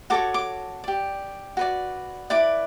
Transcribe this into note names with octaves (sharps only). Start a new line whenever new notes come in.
F#4 A4 C#5 D6
D6
G4 D5
F#4 B4 D5
E4 B4 D5 D6